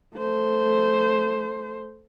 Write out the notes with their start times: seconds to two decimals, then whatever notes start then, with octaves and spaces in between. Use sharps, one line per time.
0.17 A3 C5